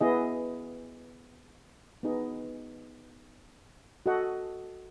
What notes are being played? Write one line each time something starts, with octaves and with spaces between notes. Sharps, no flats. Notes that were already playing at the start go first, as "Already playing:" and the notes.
B3 E4 G#4 D#5
B3 D#4 G#4 D#5
F#4 A4 D#5 F#5